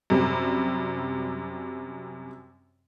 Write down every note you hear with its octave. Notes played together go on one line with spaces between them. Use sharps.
F#2 C3 G3